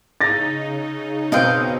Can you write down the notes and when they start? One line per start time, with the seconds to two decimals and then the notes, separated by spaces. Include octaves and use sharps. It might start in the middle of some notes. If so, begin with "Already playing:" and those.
0.21 C#3 D#4 A6 A#6
1.32 B2 C4 D#5 F5 G5